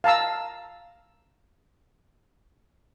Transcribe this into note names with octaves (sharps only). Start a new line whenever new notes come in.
F5 A5 A#5 E6